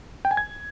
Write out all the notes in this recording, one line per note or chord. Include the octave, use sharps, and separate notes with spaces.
G5
G#5
G#6